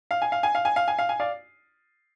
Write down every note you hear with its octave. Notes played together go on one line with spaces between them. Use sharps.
F5
G#5
F5
G#5
F5
G#5
F5
G#5
F5
G#5
D5 F5